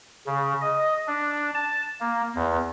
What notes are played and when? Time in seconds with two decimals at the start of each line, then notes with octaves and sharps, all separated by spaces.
0.27 C#3
0.62 D#5
1.08 D4
1.54 A5
2.01 A#3
2.35 E2